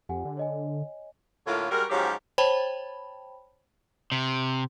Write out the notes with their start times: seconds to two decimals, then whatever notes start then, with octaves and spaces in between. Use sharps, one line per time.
0.09 F2 G4 F#5 G#5
0.25 D3
0.37 C#5 D#5 G#5
1.47 A2 D3 A#3 E4 F4 C#5
1.71 G3 G#3 F#4 A#4
1.90 G#2 F3 F#3 C#4 G4
2.38 C5 C#5 G5 A5 B5
4.12 C3